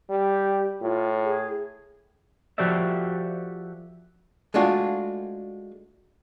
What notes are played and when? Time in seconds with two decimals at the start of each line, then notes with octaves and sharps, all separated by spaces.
0.10 G3 G4
0.81 A2 F4
1.25 G#4
2.58 F3 F#4 G4 A4 D5 E5
4.54 G#3 A3 D4 F4 F#4